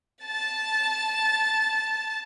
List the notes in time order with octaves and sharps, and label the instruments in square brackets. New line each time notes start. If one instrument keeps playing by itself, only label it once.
[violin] A5 A6